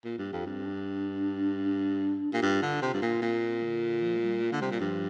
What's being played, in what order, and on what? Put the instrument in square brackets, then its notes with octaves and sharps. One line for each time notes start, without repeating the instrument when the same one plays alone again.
[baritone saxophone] A#2
G2
[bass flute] G4
[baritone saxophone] F2
[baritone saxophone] G2 [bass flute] C4
[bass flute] D4
D4
[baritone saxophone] A#2 [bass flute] G4
[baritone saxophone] G2 [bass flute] F4
[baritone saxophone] D3
[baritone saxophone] C3 [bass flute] F4
[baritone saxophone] G2
A#2
[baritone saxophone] A#2 [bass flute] C4
[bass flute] D3
F3
A#3
G3
A#3
[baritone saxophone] D3
[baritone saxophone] C3 [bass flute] G3
[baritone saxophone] A#2
[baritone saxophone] G2 [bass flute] F3